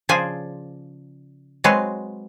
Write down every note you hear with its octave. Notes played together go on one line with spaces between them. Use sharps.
C#3 F3 G#4 C5 D5 G#5
F#3 G#3 C4 G#4 B4 C#5